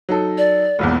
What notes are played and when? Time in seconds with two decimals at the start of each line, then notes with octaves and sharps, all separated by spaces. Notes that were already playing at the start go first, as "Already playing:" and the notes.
0.09 F#3 D#4 A4
0.38 D5
0.79 E1 A#1 E2